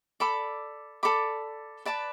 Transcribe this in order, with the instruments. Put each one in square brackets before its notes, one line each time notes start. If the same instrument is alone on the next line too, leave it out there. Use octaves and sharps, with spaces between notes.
[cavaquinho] A4 D5 B5 D6
A4 D5 B5 D6
B4 D5 A5 D6